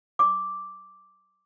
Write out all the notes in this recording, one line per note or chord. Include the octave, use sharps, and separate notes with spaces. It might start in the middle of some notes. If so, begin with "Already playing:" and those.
D6